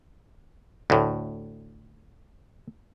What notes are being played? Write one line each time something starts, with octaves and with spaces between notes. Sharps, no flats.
D2 A2